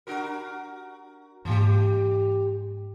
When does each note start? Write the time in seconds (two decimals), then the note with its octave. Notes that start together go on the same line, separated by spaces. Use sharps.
0.07 D4 F#4 A#4
1.45 G#2 E3 G3 A#3 G4